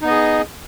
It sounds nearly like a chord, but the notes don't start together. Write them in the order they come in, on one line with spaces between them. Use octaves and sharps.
D#4 B3 D#5 G#4